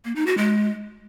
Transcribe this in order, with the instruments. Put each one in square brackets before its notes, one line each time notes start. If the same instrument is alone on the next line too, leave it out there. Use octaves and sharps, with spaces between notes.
[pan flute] A#3
D#4
F#4
G#3